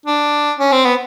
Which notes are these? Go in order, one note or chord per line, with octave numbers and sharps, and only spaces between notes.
D4
C#4
C4
B3